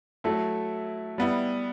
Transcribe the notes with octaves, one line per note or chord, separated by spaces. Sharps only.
F#3 A3 E4 A4
G3 B3 E4